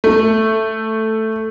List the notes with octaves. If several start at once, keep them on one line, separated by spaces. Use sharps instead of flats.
A3